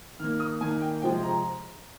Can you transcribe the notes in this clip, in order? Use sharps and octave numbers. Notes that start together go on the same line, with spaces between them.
D#3 A#3 F6
D#6
D#3 A#3 G#5
G5
C3 F3 G#3 G5
A#5